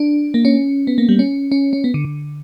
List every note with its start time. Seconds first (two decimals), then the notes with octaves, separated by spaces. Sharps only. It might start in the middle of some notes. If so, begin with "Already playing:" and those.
Already playing: D4
0.34 A#3
0.45 C#4
0.87 B3
0.98 A#3
1.09 G3
1.19 C#4
1.52 C#4
1.73 C#4
1.84 B3
1.94 D3
2.05 D3